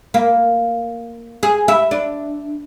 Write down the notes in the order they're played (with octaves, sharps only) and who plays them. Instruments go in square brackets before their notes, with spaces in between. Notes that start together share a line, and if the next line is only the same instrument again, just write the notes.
[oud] A#3
G#4
E4
D4